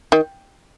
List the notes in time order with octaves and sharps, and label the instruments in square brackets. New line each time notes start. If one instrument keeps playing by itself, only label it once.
[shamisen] D#3